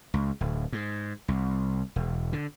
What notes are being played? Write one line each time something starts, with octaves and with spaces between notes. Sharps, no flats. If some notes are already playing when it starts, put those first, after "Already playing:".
C#2
D1
G#2
C2
E1
D3